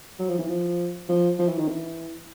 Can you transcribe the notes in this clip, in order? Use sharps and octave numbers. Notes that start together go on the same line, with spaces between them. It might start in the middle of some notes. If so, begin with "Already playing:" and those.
F#3
F3
E3
F3
F3
F3
E3
D#3
E3